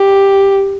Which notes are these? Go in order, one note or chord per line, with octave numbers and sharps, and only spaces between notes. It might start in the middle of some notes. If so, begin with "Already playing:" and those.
Already playing: G4